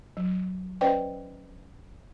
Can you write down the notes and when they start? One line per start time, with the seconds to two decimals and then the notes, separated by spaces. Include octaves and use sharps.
0.17 F#3
0.81 C#4 B4 C5 D5 D#5 G5